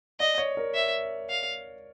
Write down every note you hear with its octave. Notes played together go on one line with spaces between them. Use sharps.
D5 D#5
C#5
A#4
E5
F5